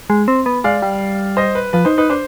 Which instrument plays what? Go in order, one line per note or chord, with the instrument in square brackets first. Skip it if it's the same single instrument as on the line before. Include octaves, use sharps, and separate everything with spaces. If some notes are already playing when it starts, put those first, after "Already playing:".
[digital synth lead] G#3
C4
B3
[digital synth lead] G#3 [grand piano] D5 F5
[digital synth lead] G3
[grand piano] C5 D#5
B4
[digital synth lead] F3 [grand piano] B4
[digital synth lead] D#4 [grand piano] C5
[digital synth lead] D#4 [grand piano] B4
[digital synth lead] D4 [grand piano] C5